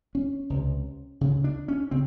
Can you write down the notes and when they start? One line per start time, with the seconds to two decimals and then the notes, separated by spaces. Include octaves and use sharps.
0.15 C#4
0.50 C#2 C3
1.21 D2 C#3
1.44 D4
1.68 C#4
1.91 C#3 C4